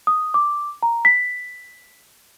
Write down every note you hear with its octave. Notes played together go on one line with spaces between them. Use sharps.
D#6
D6
A#5
B6